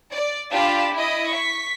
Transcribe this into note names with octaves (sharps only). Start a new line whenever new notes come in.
D5
D4 F4 G4 A5 B5
E4 D#5
C#6 B6